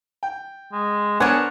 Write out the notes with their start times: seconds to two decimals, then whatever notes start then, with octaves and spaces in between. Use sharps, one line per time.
0.23 G5
0.73 G#3
1.20 B3 D4 A#4 C5 C#5 F#5 G#5